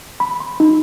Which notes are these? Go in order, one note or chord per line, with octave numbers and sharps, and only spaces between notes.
B5
C6
D#4